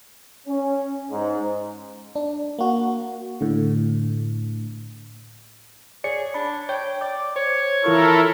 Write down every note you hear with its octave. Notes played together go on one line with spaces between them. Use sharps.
C#4
G#2
D4
A#3 F#4
A2 D3
G#4 C#5 D5 C#7
D4 B5
C#5 G5
D5 D6
C5 C#5
E3 E4 F4 A4 A#4 C#6